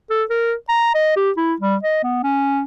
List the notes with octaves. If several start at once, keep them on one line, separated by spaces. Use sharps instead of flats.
A4
A#4
A#5
D#5
G4
E4
G3
D#5
B3
C#4